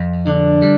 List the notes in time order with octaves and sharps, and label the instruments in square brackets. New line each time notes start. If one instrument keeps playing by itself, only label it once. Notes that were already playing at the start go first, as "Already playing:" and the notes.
Already playing: [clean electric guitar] F2
[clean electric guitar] D3 [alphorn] D4
[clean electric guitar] G3